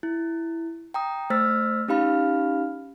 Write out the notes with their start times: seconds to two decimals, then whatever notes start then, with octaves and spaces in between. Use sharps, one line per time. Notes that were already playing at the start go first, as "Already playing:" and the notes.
0.03 E4
0.94 G5 A#5 D#6
1.30 A3 C5 E6 F6 A6 B6
1.88 C#4 D#4 G4 F5 B5 F6